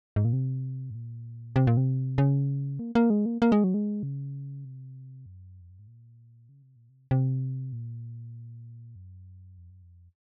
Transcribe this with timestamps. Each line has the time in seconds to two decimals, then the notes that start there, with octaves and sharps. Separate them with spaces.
0.16 G#2
0.25 A#2
0.33 C3
0.90 G#2
0.95 A#2
1.56 C3
1.67 A#2
1.77 C3
2.18 C#3
2.79 A#3
2.95 A#3
3.10 G#3
3.26 A#3
3.42 A#3
3.52 G#3
3.64 F#3
3.74 G#3
4.03 C#3
4.65 C3
5.26 F#2
5.61 F2
5.70 F#2
5.79 G#2
5.88 A#2
6.49 C#3
6.62 C3
6.76 A#2
6.89 C3
7.11 C3
7.73 A#2
8.96 F#2
9.58 F2
9.70 F#2
9.82 F2